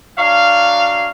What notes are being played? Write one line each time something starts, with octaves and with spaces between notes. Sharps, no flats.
F#3 D4 C#5 F5